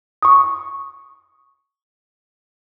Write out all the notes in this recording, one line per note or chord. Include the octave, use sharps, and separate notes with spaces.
C#6 D#6